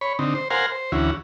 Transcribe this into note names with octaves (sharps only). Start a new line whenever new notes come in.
C#5 B5
D3 C4 D#4
C5
A#4 C5 F5 F#5 G#5 C6
C5
D2 E3 C#4 E4 F#4